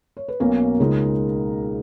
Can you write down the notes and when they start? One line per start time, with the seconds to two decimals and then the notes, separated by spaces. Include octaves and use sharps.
0.17 C#5
0.28 B4
0.40 B1 B2 A#3 C#4 A#4
0.80 C#2 C#3 G#3 D#4